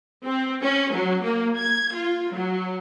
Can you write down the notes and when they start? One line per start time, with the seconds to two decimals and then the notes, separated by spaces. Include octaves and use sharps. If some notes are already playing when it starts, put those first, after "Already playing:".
0.24 C4
0.63 C#4
0.93 F#3
1.24 A#3
1.58 G#6
1.95 F4
2.32 F#3